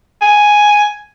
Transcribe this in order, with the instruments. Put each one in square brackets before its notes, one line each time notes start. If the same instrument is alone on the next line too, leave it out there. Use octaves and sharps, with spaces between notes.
[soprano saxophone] G#5